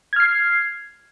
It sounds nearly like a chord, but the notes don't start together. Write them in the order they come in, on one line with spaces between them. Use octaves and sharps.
G#6 F6 C7